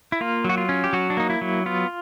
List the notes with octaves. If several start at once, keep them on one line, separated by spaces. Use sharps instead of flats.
E4
A#3 F4
F#3
F#4
F4
C#4
G4
F#3 F#4
D4
A#3 D#4
E4
F#3
B3 F4